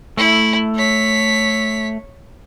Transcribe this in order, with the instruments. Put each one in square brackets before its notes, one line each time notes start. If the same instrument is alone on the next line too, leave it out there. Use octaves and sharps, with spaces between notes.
[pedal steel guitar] A3 [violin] E4
[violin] C#5 B6